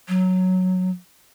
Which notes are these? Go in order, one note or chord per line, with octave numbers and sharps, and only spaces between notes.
F#3